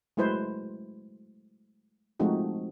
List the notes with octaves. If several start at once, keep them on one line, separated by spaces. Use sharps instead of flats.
F#3 G#3 A3 E4 B4 C5
F3 G#3 A3 C4 D#4 F#4